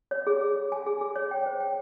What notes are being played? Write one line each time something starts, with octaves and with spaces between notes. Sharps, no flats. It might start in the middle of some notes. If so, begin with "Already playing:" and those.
C#5
G#4
G#4
G#4
G#5
G#4
G#4
C#5
G5
C5
G5